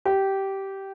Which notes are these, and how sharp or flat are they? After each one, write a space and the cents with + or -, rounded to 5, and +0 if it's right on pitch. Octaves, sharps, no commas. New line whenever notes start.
G4 -15